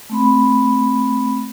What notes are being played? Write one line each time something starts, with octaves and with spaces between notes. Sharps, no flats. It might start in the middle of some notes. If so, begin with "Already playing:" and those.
A3 C4 B5